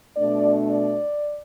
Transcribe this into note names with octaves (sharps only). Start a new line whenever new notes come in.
B2 A3 D4 D5
D5